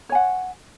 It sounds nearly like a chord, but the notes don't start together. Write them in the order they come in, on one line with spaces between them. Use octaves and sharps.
C#5 G#5 F#5